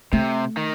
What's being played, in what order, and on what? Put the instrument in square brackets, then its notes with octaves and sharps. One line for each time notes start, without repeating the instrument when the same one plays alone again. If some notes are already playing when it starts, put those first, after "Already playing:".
[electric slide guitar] C3 [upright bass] A3
[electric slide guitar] D#3